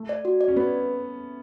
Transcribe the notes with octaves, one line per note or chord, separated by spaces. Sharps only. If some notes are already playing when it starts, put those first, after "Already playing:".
Already playing: A3
D5
F#4
D5
C#4
B3 B4